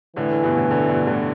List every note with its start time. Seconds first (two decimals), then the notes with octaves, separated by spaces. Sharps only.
0.16 A2 D3 E3
0.30 A2
0.43 G2 B2
0.57 A2 D3
0.71 A2 D3
0.89 G2 B2
1.07 A2 D3